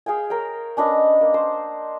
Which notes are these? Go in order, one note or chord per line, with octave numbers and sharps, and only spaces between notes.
G#4 F5 G5 G#5
A#4 C#5 G5
C#4 D4 B4 D#5
A#3
C5